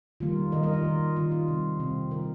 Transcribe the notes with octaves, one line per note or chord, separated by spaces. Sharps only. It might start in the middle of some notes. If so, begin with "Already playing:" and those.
D#3 G3 A#3 F4
D#3 G3 A#3 A#4 D#5
A#4 D#5
F4
D#3 A#3
D#3 A#3 F4
F4
C3 G3 C4
C3 G3 C4
C3 D#3 G3 A#3 F4 A#4